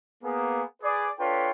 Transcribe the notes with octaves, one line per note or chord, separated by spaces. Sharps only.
A#3 B3 G#4
G#4 B4 D5
D4 F4 A4 B4 C#5 G5